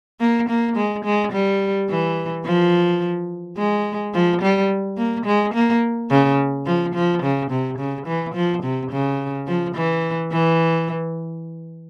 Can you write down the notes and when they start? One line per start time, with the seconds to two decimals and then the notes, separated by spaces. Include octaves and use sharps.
0.20 A#3
0.49 A#3
0.76 G#3
1.05 G#3
1.33 G3
1.89 E3
2.45 F3
3.58 G#3
4.14 F3
4.42 G3
4.98 A#3
5.26 G#3
5.54 A#3
6.10 C#3
6.66 F3
6.95 F3
7.23 C#3
7.50 C3
7.78 C#3
8.07 E3
8.35 F3
8.63 C3
8.91 C#3
9.47 F3
9.75 E3
10.32 E3